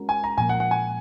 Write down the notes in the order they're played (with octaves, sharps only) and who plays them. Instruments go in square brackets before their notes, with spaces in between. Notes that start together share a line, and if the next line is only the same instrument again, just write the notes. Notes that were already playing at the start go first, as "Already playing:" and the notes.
Already playing: [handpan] G#3 C#4 F#4 A#4
[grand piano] G#5
A#5
[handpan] A#2 F3 A#3 [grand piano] G#5
[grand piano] F#5
F#5
G#5